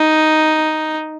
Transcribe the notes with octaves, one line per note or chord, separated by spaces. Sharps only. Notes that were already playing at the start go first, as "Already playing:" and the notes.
Already playing: D#4